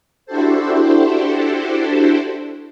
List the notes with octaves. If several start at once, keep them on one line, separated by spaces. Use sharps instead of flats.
D4 E4 F#4 G4 A4 C5